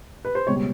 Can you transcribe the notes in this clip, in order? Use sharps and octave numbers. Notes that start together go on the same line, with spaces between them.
B4
C5
C#2 B2 G3 C#5